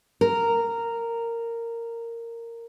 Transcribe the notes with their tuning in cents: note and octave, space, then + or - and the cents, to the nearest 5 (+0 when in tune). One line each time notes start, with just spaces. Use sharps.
A#4 -10